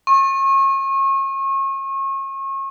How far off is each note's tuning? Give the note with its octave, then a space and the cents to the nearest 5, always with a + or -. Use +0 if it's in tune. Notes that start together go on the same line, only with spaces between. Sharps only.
C#6 -35